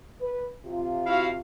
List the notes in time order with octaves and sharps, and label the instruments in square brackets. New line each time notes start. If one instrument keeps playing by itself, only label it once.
[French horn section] B4
C3 F4
[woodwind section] E4 F#4 F5